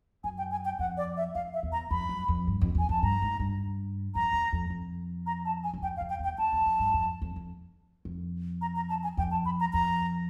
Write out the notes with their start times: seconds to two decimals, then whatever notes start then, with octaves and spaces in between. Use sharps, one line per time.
0.24 F#2 G#5
0.38 G5
0.51 G#5
0.65 G5
0.79 F2 F#5
0.97 D5
1.17 E5
1.35 F2 F5
1.54 E5
1.63 E2
1.72 A#5
1.91 F2 B5
2.09 F#2
2.28 F2
2.47 G2
2.61 F2
2.75 E2 G#5
2.89 F2 A5
3.03 G2 A#5
3.22 G#2
3.39 G2
4.15 F2 A#5
4.33 E2
4.52 F2
4.70 F2
5.26 A#5
5.45 A5
5.64 G#5
5.73 F#2
5.82 F2 G5
5.97 F5
6.01 F2
6.10 G5
6.19 E2
6.24 G5
6.38 F2 A5
6.52 E2
6.66 F2
6.79 G2
6.94 F2
7.22 F2
7.36 F2
8.05 F2
8.61 A#5
8.76 A#5
8.89 A5
9.03 G#5
9.17 F2 G5
9.31 A5
9.45 B5
9.60 A#5
9.73 F2 A#5